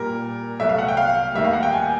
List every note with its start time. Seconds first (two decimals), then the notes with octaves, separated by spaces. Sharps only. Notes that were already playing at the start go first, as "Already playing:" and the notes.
Already playing: A#2 G3 A#4
0.60 C2 B2 F#3 A3 E5
0.69 F5
0.78 F#5
0.88 G5
0.97 F5
1.34 D#2 D#3 G3 E5
1.45 F5
1.53 F#5
1.63 G5
1.73 G#5